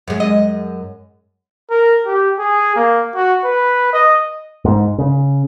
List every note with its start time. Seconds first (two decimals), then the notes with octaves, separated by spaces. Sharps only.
0.08 F#2 G#3
0.20 D#5
1.70 A#4
2.06 G4
2.39 G#4
2.76 A#3
3.15 F#4
3.44 B4
3.93 D#5
4.65 G#2
4.98 C#3